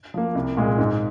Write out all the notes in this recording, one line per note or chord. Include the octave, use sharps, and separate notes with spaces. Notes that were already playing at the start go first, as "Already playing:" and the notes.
F3 A#3
C2
A#2 G#3
G#2